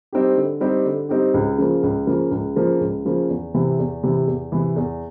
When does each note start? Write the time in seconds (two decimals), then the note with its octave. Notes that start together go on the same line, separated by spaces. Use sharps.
0.13 G3 C4 D#4 G4
0.36 D3
0.61 G3 C4 D#4 G4
0.85 D3
1.09 G3 C4 D#4 G4
1.34 C#2
1.58 C#3 F3 A#3
1.83 C#2
2.07 C#3 F3 A#3
2.31 C#2
2.56 C#3 F3 A#3
2.81 C#2
3.05 C#3 F3 A#3
3.29 E2
3.54 C3 E3
3.79 E2
4.03 C3 E3
4.27 E2
4.52 C3 E3
4.76 E2